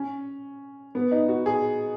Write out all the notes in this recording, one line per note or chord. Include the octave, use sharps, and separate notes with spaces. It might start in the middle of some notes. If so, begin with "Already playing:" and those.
Already playing: C#4
B3
D#4
F#4
G#4